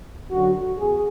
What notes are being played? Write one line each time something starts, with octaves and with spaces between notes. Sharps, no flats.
F#2 D3 F#3 F#4
E2 G#4